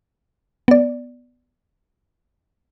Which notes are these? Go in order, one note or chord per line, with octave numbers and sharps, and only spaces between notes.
B3 D5